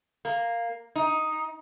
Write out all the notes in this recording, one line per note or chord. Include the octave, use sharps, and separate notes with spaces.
A#3
D#4